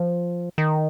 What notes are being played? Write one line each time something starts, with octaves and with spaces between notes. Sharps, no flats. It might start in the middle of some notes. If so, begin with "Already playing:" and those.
Already playing: F3
D#3